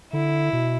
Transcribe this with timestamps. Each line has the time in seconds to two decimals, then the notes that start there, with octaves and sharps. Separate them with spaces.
0.13 D3 E4
0.53 B2